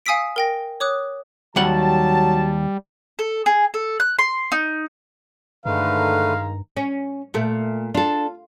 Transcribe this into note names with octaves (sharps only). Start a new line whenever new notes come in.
F5 G#5 D#6 E6 B6 D7
A#4 G5 A#6
C#5 D6 D#6 F#6
D#2 F#3 G3 F#5 A5
A4
G#4
A4
F#6
C6
D#4
G2 D3 D#3 G#3 A3 B4 F5 A#5
C#4
A#2 A3
D4 F4 A4